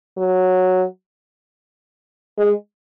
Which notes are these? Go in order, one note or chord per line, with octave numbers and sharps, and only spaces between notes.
F#3
G#3